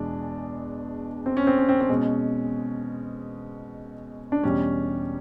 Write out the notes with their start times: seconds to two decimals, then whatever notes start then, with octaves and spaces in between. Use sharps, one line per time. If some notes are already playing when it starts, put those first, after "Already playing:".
Already playing: E2 B2 G#3 D4
1.26 C4
1.37 C#4
1.47 C4
1.59 C#4
1.69 C4
1.81 C4
1.89 B2 G#3 C#4
4.32 D4
4.43 E2 B2 G3 C#4